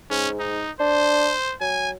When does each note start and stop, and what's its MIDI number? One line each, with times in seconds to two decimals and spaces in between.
0.11 0.65 44
0.11 0.28 61
0.40 0.71 63
0.80 1.32 62
0.80 1.54 72
1.61 1.96 54
1.61 1.90 80